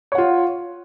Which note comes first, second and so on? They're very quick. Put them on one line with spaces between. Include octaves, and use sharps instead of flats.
C#5 F#5 F4